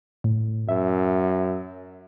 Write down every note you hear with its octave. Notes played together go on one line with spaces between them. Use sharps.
A2
F#2 E5